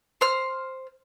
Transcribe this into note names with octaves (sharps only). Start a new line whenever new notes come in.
C5 F6